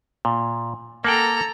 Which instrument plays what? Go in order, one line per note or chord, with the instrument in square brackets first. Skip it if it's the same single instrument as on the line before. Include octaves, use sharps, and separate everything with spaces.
[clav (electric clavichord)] A#2
[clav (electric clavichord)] A#3 F#5 G5 [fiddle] A4 A#5